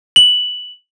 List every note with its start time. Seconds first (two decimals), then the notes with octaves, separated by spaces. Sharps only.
0.16 F#7